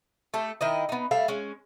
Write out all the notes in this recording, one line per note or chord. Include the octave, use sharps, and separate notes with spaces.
A3 G4 A4
D#3 E4 D#5
B3 D#4
G3 A3 E5 F5
G#3 C#4